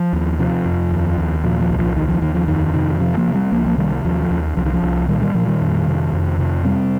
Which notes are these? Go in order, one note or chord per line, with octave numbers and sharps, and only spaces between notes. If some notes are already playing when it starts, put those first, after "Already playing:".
Already playing: F3
D#2
C3 F3
F2
D#2
D#2
A#2 F3
F3
C2
F3
D#2 D#3
F3
D#2 D#3
F3
F2 D#3
C3 D#3
C3 F3
F3 A#3
C3
G3 C4
C2 F3 A#3
F3 A#3
C3 D#3 G3
D#2 F3
F3
D#2
C2 F3
D#3
F3
C2
A#2 D#3 G3
D#3 G3
A#2 F3
D#3 G3
F2
C3
F2
C3
C3 G3 C4